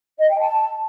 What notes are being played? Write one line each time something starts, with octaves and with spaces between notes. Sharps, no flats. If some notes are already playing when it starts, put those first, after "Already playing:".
D#5
G5
A5